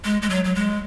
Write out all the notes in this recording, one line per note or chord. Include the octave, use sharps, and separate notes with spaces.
G#3
G#3
F#3
F#3
G#3